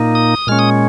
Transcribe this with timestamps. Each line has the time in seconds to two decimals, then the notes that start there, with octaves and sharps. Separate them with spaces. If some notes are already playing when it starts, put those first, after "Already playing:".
Already playing: A#2 A#3 D#4
0.15 D#6
0.47 A#2 G#3 C#4 F6
0.59 D#6